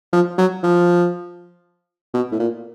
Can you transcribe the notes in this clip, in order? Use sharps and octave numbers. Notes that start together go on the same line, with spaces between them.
F3
F#3
F3
B2
A2
A#2